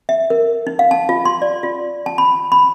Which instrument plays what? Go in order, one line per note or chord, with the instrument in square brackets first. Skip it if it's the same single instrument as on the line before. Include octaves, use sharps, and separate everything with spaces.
[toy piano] E5
A#4
D#4
F5
A5
F4
C6
D5
F4
A5
B5
B5